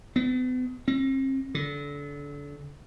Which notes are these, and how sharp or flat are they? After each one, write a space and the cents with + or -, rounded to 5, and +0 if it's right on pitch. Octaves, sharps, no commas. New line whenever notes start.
B3 +40
C4 +40
D3 -30